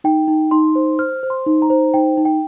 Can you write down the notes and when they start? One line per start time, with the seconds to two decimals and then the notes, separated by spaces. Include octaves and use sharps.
0.04 D#4 G5
0.28 D#4
0.51 D#4 C6
0.75 C5
0.99 C5 F6
1.23 C5
1.30 C6
1.46 D#4
1.62 A#5
1.70 C5
1.94 D#4 G5
2.17 D#4
2.25 G5